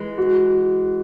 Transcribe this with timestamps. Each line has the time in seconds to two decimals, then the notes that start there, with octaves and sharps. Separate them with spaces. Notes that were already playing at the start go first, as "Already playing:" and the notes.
Already playing: E3 G#3
0.18 F#4